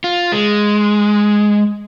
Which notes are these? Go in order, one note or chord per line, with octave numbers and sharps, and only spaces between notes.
F4
G#3